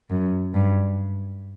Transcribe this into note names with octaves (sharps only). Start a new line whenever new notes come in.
F#2
G2